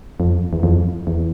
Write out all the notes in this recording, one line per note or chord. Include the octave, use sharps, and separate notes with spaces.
F2
E2
F2
E2